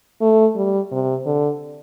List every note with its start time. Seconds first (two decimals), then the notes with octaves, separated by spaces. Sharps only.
0.21 A3
0.56 G3
0.92 C3
1.26 D3